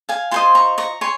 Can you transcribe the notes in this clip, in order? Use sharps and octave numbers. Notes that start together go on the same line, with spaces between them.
F5 G#5
F4 C5 D#5 G#5 C6
A#5 C#6
A#5 C#6
C#5 G#5 C6